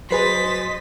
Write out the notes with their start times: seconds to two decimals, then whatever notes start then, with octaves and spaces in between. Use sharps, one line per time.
0.11 F#3 G#4 B4 C5 D#5 C6 A6 B6